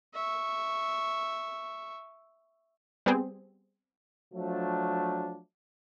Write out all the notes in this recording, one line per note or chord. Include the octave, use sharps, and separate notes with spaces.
E5 C#6
G3 B3 C4 G#4
F3 F#3 A3 D4